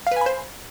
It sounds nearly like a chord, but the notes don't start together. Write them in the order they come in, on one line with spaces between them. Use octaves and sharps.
F5 B4 G#5 B5 C5